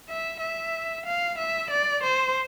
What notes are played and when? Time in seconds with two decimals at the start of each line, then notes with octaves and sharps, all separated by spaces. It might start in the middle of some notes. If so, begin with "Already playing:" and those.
0.09 E5
0.41 E5
1.06 F5
1.38 E5
1.71 D5
2.03 C5